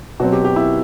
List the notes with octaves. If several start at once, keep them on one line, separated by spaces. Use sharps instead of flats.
B2 F#3 C4 F#4
G4
G4
E4